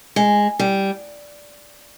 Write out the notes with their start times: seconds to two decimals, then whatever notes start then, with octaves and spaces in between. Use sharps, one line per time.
0.16 G#3
0.59 G3